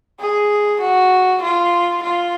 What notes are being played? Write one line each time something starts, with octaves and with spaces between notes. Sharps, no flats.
G#4
F#4
F4
F4